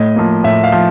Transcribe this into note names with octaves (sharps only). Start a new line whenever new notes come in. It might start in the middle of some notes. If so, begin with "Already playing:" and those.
Already playing: A2 D#5
F3 A#3
A2 E5
F5
F3